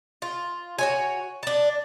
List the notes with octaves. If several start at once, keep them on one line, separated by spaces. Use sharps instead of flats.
F4
F#4 C#5 G#5
D4 A5